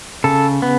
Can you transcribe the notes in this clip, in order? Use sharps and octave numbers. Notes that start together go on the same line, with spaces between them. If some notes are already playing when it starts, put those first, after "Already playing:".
C#3 A4
B3